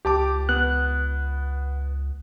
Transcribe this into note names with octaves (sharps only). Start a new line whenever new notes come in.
C#2 G4 A5 D6
B3 F#6